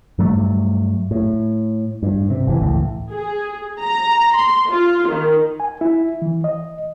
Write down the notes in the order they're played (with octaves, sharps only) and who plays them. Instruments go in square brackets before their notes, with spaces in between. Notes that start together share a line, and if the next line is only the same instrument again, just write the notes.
[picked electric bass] G2 F#3 G3 A3
A2
G2
C3
F#1 E3
C#2 A2 E3
[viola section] G#4
A#5
C6
F4
D#3
[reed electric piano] G#5
E4
E3
D#5